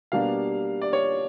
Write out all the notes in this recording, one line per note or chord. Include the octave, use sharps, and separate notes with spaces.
B2 G3 A#3 D4 F5
D5
C#5